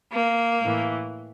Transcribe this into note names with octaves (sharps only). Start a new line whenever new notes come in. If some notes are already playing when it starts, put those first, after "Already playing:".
A#3
A2 E3